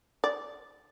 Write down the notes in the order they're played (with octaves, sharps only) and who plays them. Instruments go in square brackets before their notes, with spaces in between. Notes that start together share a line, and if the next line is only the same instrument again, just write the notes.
[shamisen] D5